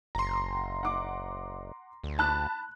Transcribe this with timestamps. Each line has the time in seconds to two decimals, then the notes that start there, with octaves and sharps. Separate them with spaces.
0.15 F#1 A#5 C6
0.83 F#5 D6
2.03 D2
2.19 A5 B5 F#6